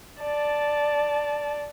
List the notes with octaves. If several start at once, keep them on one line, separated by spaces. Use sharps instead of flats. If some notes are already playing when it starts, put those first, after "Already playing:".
D5 A5